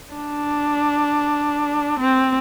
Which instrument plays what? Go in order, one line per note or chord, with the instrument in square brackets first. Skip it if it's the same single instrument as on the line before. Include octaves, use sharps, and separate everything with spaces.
[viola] D4
C4